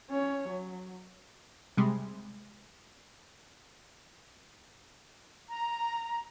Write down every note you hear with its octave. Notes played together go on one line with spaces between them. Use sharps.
C#4 C#5
F#3
C3 G3 G#3
A#5